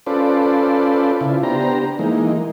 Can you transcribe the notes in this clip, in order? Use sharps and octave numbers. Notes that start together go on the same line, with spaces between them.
C#4 F4 A4 B4 C5 D5
C#3 E4 F4
B3 D4 G4 C5 A#5
E3 G#3 A#3 D#4